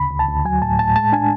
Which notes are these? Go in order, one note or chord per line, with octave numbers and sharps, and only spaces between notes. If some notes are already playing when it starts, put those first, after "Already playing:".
Already playing: D2 C#3 B5
D2
A5
D2
F#3 G#5
A2 A5
A2 A5
G#3 A5
D4 G#5